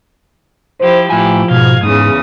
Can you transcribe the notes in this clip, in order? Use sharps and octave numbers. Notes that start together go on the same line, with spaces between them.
F3 E4 G4 C5
A2 F3 E4 G4 G#5
G#2 B2 F5 G#6
E2 G#2 C#3 D#6